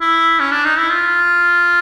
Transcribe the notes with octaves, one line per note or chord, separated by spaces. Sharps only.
E4
C#4
D4
D#4
E4
F4